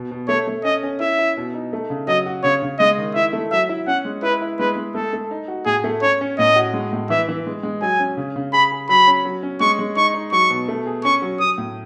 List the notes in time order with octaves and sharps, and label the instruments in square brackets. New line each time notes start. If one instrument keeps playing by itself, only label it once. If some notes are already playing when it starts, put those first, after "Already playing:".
Already playing: [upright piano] B2
B2
[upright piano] A3 [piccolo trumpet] C#5
[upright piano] A3
[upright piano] C#4 [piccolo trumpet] D#5
[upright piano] C#4
[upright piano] E4 [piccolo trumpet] E5
[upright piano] E4
B2
D#4
A3
C#3
[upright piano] F#3 [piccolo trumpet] D#5
[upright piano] F#4
[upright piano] C#3 [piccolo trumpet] C#5
[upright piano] C#3
[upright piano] G#3 [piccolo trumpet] D#5
[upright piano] D#3
[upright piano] E4 [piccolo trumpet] E5
[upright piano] A3
[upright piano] F#3 [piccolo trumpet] E5
[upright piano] E4
[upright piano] C#4 [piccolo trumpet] F#5
[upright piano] G#3
[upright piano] E4 [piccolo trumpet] B4
[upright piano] E4
[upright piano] G#3 [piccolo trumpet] B4
[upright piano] G#3
[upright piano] A3 [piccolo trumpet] A4
[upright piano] A3
D#4
F#4
[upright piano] A2 [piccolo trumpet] G#4
[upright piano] A3
[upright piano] C#4 [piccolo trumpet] C#5
[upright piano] C#4
[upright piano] A2 [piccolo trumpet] D#5
[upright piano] F#4
G#3
A2
[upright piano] E3 [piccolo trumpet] E5
[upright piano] E3
G#3
G#3
[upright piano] F#3 [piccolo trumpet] G#5
[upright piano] C#4
C#3
C#3
[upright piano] G#4 [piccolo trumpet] B5
[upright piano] G#4
[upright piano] F#3 [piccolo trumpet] B5
[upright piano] C#4
F#3
C#4
[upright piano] G#3 [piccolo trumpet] C#6
[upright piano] G#3
[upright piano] D#4 [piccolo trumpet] C#6
[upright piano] D#4
[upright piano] F#3 [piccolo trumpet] C#6
[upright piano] B2
A3
G#4
[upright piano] C#4 [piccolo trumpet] C#6
[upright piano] F#3
[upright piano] F#3 [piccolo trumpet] D#6
[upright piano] A2